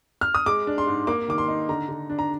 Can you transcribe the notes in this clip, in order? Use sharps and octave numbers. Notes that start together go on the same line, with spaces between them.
F6
D#6
G#3 D6
D4
C6
G#2
A#3 D6
D#3 D6
C6
D#4
D3 A#5
D3
D4
A#5